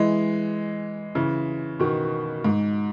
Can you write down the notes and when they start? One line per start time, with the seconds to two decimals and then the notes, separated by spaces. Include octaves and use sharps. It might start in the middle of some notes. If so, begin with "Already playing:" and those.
Already playing: E3 G#3
1.15 C#3 E3
1.80 B2 D#3
2.44 G#2